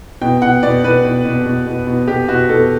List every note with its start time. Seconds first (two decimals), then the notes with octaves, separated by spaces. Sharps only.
0.21 B2 G5
0.42 B2 F#5
0.63 B2 D5
0.84 B2 B4
1.04 B2
1.25 B2
1.46 B2
1.67 B2
1.87 B2
2.08 B2 G4
2.28 B2 F#4
2.49 B2 A4